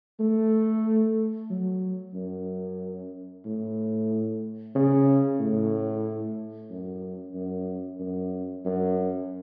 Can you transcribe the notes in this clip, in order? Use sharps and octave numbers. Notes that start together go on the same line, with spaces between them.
A3
F#3
F#2
A2
C#3
A2
F#2
F#2
F#2
F#2